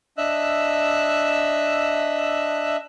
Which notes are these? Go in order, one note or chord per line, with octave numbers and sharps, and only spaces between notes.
D4 D#5 E5 E6 F#6